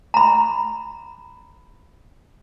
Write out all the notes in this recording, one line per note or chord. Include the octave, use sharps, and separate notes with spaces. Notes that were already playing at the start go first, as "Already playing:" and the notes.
A#5 B5